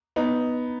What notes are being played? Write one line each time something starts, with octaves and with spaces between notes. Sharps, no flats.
B3 D#4